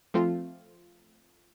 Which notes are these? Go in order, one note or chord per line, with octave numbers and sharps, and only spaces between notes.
F3 A3 C4 F4